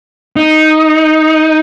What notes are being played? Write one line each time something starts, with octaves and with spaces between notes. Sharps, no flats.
D#4